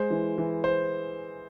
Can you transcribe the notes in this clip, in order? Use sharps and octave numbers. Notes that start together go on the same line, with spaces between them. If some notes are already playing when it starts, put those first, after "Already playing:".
Already playing: G#3 C5
E3
E3
C5